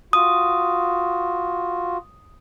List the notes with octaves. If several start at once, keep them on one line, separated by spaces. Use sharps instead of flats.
F4 F#4 D#6